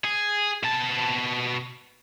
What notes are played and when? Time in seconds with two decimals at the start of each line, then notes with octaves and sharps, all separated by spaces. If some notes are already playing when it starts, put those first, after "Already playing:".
0.05 G#4
0.63 B2 A5